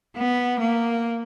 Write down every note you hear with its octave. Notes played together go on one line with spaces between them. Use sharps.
B3
A#3